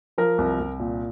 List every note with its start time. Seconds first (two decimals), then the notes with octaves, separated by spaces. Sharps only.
0.18 F3 A#4
0.38 C2
0.60 C2
0.80 A#2